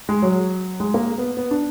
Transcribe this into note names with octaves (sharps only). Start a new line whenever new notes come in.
G#3
F#3
G#3
A#3
B3
B3
D4